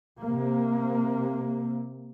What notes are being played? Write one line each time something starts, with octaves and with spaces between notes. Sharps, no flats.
C3 A#3